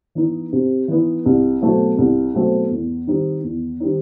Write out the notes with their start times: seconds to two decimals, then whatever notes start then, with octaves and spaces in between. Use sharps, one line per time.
0.15 E3 B3 D#4
0.53 C3
0.88 E3 B3 D#4
1.26 C2
1.62 B2 F#3 A3 C4
1.98 C2
2.34 B2 F#3 A3 C4
2.71 E2
3.07 D#3 G3 C4 D#4
3.44 E2
3.80 D#3 G3 C4 D#4